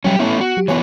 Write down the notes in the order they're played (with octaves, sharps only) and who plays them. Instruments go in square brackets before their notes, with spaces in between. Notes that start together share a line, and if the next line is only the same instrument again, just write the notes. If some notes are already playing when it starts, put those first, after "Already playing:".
[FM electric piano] F#3 G3 [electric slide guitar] C#4 G4
[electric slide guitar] A3 C#4 E4 [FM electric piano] B3
[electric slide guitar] F#4
[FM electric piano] F#3 G4
[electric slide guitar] E3 F#3 B3 [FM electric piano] C#5 G#5 C#6